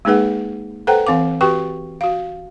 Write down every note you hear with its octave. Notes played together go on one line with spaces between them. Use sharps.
G#3 A#3 D#4 G#4 B4 F#5
A4 B4 C5 F#5 G5 A#5
E3 C4 F5 D6
F#4 G4 B4 G5 C#6
F#4 F5